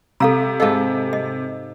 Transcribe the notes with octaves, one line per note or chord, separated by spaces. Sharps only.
C3 A4 F5 A#5
G#2 A4 D#5 F5
D#5